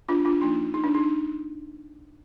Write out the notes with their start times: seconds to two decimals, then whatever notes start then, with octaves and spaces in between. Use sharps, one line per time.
0.09 D4 F4
0.25 D4 F4
0.40 F3 A#3 D4 D#4
0.74 D#4
0.84 D4
0.95 D#4